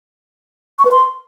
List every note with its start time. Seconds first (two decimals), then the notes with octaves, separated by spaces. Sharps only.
0.79 C#6
0.85 B4
0.91 C6